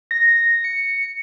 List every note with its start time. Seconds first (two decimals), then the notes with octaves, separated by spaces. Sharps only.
0.11 A#6
0.64 C#7